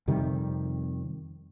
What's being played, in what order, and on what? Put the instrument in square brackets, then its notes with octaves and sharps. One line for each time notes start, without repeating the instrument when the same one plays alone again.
[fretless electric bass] F2 C3 D#3 G3